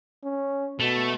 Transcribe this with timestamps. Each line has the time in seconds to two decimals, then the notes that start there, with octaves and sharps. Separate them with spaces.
0.24 C#4
0.80 B2 A3